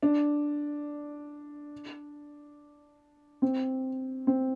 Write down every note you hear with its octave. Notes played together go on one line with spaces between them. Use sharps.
D4
C4
C4